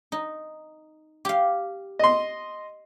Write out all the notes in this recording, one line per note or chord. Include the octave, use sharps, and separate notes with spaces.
D#4
G4 F5
D#5 C6